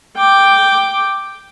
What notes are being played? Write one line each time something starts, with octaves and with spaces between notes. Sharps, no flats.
G5 D6